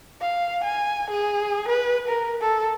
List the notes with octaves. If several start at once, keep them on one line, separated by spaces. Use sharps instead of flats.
F5
G#5
G#4
B4
A#4
A4